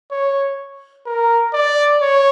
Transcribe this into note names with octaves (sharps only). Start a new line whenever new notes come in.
C#5
A#4
D5
C#5